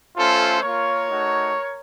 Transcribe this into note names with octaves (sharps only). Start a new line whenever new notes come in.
A3 C#4 F4 A4 C5
A#3 F4 A#4 C#5
A3 D#4 F#4